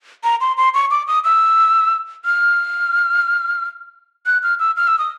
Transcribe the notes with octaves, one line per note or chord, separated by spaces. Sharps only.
A#5
C6
C6
C#6
D6
D#6
E6
F6
F#6
F6
E6
F6
E6
D#6